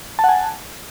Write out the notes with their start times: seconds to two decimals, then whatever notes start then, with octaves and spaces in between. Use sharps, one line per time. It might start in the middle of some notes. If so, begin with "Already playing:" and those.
0.19 A5
0.24 F#5
0.29 G#5